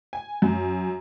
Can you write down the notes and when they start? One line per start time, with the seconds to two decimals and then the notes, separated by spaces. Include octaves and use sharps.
0.13 G#5
0.42 F#2